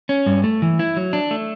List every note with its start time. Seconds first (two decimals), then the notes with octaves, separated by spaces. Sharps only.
0.09 C#4
0.26 G2
0.44 A3
0.62 E3
0.79 E4
0.97 F#3
1.13 D4
1.31 A3